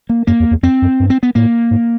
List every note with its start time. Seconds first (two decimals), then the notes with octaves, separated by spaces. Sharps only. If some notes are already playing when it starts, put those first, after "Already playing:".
0.09 A#3
0.27 F#2 A#3
0.40 E2
0.51 E2
0.63 F2 C4
0.82 F#2
1.00 G2
1.10 C4
1.23 B3
1.35 A2 A#3
1.71 G#2